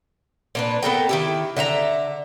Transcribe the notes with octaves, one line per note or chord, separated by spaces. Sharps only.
A#2 D4 B4
B3 A4 A#4 G5
D#3 E4 G4
D3 E5 G#5 A#5